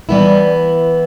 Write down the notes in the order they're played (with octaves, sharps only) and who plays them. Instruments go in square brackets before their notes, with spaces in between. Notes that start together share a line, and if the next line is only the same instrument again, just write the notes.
[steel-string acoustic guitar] E3 B3 E4 [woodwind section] G3